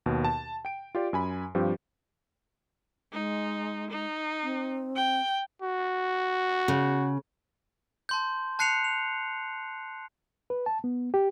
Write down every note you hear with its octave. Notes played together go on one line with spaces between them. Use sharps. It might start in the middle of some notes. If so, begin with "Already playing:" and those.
D#2 B2
A5
G5 D7
F4 G4 D5
F#2 G#5 B5
G2 F3 C4 G4
G#3 D#4
D#4
C4
G5
F#4
C#3
A5 C6 G6
A5 F#6 C7 C#7 F7
F7
B4
A5
B3
G4